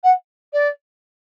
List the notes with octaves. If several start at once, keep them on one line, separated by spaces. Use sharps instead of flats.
F#5
D5